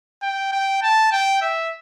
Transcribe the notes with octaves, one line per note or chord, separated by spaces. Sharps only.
G5
G5
A5
G5
E5